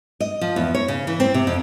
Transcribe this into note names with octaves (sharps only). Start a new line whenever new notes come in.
D#5
F3
E2
C#5
C#3
E3
C4
C3
F2